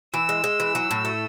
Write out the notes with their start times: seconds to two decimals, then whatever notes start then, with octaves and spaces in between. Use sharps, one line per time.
0.14 E3 E6
0.29 G#3
0.44 G#3
0.60 E3
0.75 F#3
0.91 A2
1.05 A3